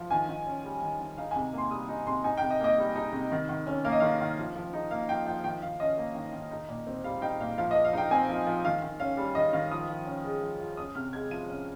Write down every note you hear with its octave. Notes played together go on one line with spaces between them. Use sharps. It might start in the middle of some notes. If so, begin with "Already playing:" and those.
Already playing: F3
D#3 G#5
D#3
C#4
G3
D#3
D#3
D#4 F5
G#5
C3
A#3 C6
G3 D#6
D#4
C3 C6
D#4 G#5
G5
C3
D#5
A#3 D#5
G3
D#4
C3
D#3
D#3
C#4
A#3 F5
D#5
D#3 F5
D#3
F3
F3
D#4
A#3 F5
F3 G5
F3 G5
D#3 G5
D#3 F5
C#4 D#5
A#3
D#3
D#3
D#4
A#2
C4
G3 F5
D#4 G5
A#2 F5
F3 F5
D#5
F3
F5
D#4 G5
C4 G#5
F3
F3
D#3 F5
D#3
C#4 F5
G3
D#3 D#5
D#3 F5
F3 D#6
F3
C#4
G#3
F3
F3
C#4 D#6
C3 F6
G#3 G#6
F3 D#7
C#4